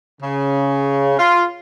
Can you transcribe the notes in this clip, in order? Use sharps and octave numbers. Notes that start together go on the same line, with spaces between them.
C#3
F4